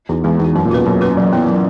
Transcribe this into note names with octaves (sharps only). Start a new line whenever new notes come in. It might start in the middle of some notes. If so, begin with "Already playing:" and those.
E2 D#4 F#4
E2 G#3
E2 D#4 F#4
F#2 C#4
A#2
B2 F#4 B4
F#2 C#4
F#4 B4
F#3
B3 E4
F#3